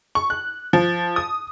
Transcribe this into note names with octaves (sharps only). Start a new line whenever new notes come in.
C#6
F#6
F3
D#6